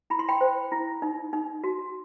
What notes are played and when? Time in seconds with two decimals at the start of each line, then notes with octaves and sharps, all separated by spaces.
0.10 E4 B5
0.19 C6
0.28 G5 B5
0.41 C5
0.72 E4
1.02 D#4
1.33 D#4
1.64 F#4